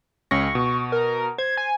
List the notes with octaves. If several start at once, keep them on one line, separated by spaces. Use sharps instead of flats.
C#2 C#4 C#6 A#6
B2
A#4
C5 G#6
G#5